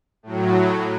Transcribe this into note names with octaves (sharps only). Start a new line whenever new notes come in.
A2 F#3